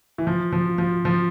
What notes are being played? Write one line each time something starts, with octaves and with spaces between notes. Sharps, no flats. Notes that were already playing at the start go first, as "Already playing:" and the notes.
E3
F3
F3
F3
F3